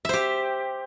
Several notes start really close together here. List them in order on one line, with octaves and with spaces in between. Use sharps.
E5 C5 G4